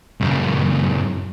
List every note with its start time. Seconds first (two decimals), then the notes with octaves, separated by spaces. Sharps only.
0.21 C#2 F#2